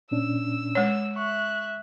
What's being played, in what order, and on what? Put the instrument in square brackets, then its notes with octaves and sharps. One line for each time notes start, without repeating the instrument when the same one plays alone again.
[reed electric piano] A#2 C#4 D4 [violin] E6
[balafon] G#3 C#5
[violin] E5 F#6 [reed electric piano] C#6